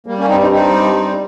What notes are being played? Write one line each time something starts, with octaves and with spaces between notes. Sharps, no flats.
G3 A#3
A#3 C#4
G2 C4 D#4
C4 D#4
G3 C4 D#4
G2
G3